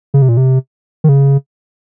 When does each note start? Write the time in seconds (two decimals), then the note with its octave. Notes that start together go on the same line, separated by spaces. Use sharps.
0.14 C#3
0.22 C3
0.29 A#2
0.37 C3
1.04 D#3
1.09 C#3